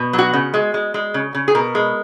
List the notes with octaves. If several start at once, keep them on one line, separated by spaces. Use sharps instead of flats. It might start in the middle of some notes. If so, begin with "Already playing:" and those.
Already playing: B2
F#3
F#4
C#3
G#3
G#3
G#3
C#3
C#3
G#4
B2 A#4
G#3